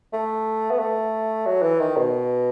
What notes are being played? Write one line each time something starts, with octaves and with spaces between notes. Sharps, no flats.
A3
B3
A3
F#3
E3
D#3
B2